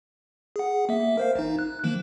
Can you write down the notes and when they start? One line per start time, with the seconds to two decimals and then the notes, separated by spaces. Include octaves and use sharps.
0.56 G#4 F#5
0.89 A#3 E5
1.17 A#4 C5 F5
1.35 A1 D#4
1.59 F#6
1.84 D#3 F3 A#3